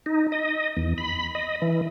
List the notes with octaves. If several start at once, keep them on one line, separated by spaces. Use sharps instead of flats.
D#4
D#5
E2
B5
D#5
E3